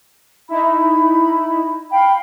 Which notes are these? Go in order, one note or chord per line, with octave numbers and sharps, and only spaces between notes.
D#4 E4 B5
F5 G5 B5